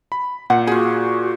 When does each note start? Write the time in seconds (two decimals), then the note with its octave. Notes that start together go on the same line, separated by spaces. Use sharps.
0.12 B5
0.50 A#2 F#5
0.67 F4 F#4 G#4